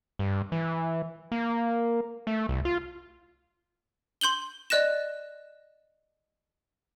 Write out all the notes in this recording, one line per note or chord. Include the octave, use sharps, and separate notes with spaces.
G2
E3
A#3
A3
C2
F4
C6 G6 F#7 G7
D5 D#5 F#6 A#6 E7